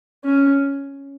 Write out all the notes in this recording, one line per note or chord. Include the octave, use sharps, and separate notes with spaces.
C#4